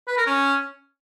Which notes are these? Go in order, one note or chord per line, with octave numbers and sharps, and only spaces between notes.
B4
A#4
C#4